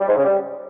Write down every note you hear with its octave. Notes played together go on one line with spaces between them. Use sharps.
G3
G#2
C#3
G3